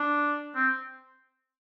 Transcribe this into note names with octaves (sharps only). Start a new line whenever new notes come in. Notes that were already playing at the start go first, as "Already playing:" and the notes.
Already playing: D4
C4